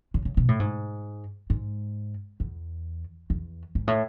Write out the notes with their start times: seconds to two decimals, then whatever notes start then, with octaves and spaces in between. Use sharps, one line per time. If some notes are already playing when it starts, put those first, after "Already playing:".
0.14 C#3
0.25 C#3
0.37 B2
0.48 A2
0.60 G#2
1.50 G#2
2.40 E2
3.30 E2
3.75 G#2
3.87 A2